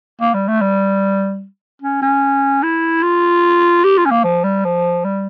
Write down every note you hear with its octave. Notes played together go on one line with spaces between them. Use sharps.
A#3
G3
A3
G3
C#4
C#4
E4
F4
G4
F4
C#4
A#3
F3
G3
F3
G3